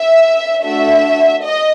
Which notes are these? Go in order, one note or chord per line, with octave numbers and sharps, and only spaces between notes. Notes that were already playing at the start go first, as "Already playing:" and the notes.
Already playing: E5
A3 D4 F#4 E5
D#5